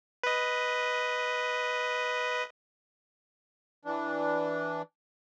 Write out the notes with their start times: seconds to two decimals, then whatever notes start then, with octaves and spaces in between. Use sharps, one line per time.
0.23 B4 D#5
3.85 E3 D4